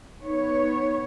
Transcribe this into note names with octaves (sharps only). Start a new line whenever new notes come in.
B3 D#4 C#5